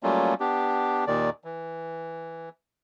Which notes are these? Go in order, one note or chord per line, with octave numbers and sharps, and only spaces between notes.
F#3 G3 A3 A#3 C#4 F4
B3 D4 G4
D#2 A#2 D#3 D5
E3